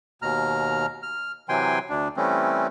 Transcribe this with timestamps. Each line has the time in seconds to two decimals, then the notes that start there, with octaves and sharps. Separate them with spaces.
0.22 D#2 B2 A#5 F6
1.03 F6
1.49 C3 E3 F#3 G5 G#5 C6
1.89 D2 D4
2.17 E3 G3 A3 C4 C#4